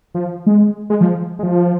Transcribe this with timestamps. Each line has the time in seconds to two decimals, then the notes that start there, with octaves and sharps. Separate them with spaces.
0.14 F3
0.47 G#3
0.90 G#3
1.01 F3
1.39 G#3
1.43 F3